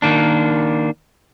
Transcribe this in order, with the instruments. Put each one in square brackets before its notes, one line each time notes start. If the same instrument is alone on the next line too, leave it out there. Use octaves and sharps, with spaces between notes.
[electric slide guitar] D#3 A#3 D4